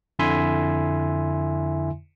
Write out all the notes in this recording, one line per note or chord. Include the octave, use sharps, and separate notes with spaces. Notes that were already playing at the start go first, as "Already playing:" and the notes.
F2 D3 E4 E5 G#5 C6